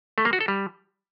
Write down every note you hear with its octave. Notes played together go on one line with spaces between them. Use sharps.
A3
A#3
F#4
A4
G3